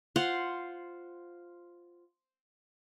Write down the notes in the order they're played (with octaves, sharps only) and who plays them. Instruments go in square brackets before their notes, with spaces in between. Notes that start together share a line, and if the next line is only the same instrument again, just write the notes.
[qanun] F4 C5 F5 F#5